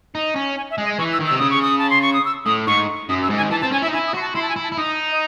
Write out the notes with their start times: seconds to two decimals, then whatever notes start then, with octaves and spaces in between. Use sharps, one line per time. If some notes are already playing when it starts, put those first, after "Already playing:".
0.15 D#4
0.36 C#4
0.57 G#5
0.71 E5
0.78 G#3
0.85 D#5
0.99 E3 C#6
1.13 E6
1.19 D#3
1.27 C3 E6
1.38 C#3 D#6
1.50 C#6
1.62 D#6
1.78 A5
1.90 C6
2.02 C#6
2.13 D#6
2.25 E6
2.46 A2 D#6
2.67 G#2 C#6
3.09 F#2 D#6
3.23 E6
3.30 G#2
3.37 G#5
3.41 D#3
3.51 E3 A5
3.61 A5
3.64 C4
3.72 C#4 G#5
3.83 E4 E5
3.88 D#4
3.93 E4 G#5
4.07 D#6
4.14 F#4 C6
4.21 A5
4.35 E4 C6
4.42 A5
4.49 G#5
4.56 E4
4.64 A5
4.72 E4
4.77 D#4 D#6
5.12 D#5